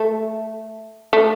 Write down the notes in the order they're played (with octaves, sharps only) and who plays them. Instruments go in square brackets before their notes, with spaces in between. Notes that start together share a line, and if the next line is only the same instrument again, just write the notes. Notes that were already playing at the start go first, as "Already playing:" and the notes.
Already playing: [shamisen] A3
A3